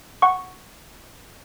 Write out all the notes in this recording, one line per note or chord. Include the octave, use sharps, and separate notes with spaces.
F#5 C#6